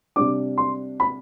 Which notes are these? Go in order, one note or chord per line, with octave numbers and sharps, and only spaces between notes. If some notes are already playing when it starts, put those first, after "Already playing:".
C3 G3 D4 D6
C6
B5